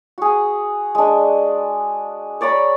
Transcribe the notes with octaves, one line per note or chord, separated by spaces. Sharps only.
F#4 G#4
G#3 D4
C#5 D5 A#5 B5